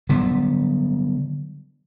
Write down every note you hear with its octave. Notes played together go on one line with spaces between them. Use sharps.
D3 F#3 G3 B3